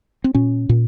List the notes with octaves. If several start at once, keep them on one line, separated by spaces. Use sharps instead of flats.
C4
A#2 C#4
A#2